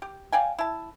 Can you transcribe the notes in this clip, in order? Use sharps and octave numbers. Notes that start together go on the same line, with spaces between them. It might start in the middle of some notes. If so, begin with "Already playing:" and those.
G4
D5 F5 G5 G#5
E4 A5